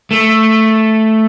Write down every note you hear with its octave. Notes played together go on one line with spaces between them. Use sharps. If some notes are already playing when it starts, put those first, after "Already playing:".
A3